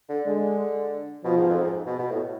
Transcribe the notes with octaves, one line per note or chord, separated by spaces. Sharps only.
D3
D3 G#3
B2 F3
G#2
F2
G#2
B2
B2
A2